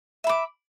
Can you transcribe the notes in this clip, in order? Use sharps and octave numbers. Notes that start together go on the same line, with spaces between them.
E5 B5 D6